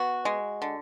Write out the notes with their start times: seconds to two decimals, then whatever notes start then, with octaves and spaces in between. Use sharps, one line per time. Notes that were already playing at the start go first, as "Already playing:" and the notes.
Already playing: B3 F#4
0.25 G#3
0.62 D3